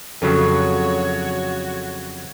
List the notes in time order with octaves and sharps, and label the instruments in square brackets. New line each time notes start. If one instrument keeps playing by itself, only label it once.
[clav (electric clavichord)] F2 C#3 F#3 [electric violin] F#4 C#5 [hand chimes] A4 C#6